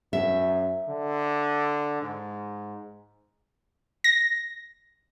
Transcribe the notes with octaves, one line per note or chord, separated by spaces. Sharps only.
F#2 E5
D3
G#2
A#6